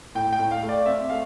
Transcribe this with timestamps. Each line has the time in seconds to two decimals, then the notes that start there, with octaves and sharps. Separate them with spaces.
0.15 A2 G5
0.33 G5
0.39 A2
0.51 F5
0.62 A3
0.69 D5
0.86 C4 E5
1.10 A3 F5